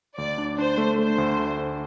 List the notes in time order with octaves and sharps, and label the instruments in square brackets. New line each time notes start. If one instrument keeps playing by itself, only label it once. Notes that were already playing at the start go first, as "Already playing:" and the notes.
[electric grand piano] D2 [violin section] D5
[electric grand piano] D4
[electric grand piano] D4 [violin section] C5
[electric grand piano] A3
[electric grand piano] A3 [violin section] C5
[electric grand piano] D2
A3
D4